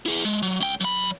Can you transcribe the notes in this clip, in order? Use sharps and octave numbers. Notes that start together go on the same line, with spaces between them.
E4 G#4
G#3
F#3
C#2 G5
F#3 B5